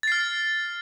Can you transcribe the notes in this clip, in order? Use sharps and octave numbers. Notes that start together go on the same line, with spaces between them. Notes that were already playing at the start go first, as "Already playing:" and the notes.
F6 A6 C7